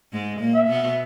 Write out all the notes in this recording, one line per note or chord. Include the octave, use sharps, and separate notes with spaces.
G#2 G#3
A#2 A#3
E5
B2 B3